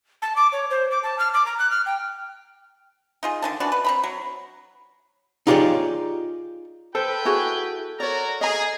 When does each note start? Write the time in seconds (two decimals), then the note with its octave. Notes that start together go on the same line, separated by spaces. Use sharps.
0.22 A5
0.36 D6
0.53 C#5
0.70 C5
0.91 D6
1.03 A5
1.19 F6
1.34 D6
1.46 A#5
1.59 F#6
1.70 F6
1.86 G5
3.23 D#4 F4 G#4
3.42 D3 D#3 A5
3.60 E3 D4 F#4 D5
3.72 B4
3.85 C4 A#5 B5
4.04 F#3
5.47 D#4 F4 G4 G#4 C#5 D5
6.95 A4 B4 C5 G5
7.25 E4 F#4 G#4
8.00 F#4 A#4 C#5 D5 A#5
8.41 G#4 D#5 A#5